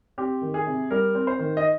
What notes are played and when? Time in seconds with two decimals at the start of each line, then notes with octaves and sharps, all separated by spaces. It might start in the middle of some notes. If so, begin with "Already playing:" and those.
0.18 C4 G4
0.42 D#3
0.54 G#4
0.67 C3
0.91 G3 A#4
1.15 C4
1.27 C5
1.39 D#3
1.57 D#5